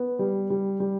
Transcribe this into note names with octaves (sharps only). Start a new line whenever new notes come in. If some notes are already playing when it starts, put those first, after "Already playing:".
Already playing: B3
G3
G3
G3